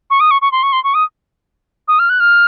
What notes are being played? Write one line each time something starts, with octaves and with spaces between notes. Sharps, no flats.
C#6
D#6
C#6
C#6
C6
C#6
C6
C#6
D#6
D#6
F6
F#6
F6